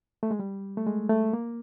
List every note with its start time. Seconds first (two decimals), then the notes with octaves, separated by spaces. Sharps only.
0.23 A3
0.31 G#3
0.39 G3
0.77 A3
0.86 G#3
1.09 A3
1.33 A#3